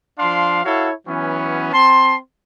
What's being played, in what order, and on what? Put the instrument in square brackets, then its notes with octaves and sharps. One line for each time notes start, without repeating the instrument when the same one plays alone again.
[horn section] F3 D4 F5 C6
E4 F#4 A4 C#5 F5
E3 F#3 B3 C#4
C4 A5 C6